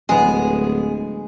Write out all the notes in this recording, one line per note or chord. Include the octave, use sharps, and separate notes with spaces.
D1 G#3 B3 G#4